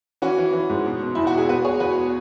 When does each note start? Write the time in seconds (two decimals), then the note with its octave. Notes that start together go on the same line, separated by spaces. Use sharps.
0.22 E3 C#4 F#4
0.38 E3
0.53 E3
0.70 G#2
0.86 B2
1.02 B2
1.15 E2 E4
1.27 F#4
1.33 B2
1.38 G#4
1.49 B2 F#4 B4
1.65 B2 G#4 C#5
1.80 E2 F#4 B4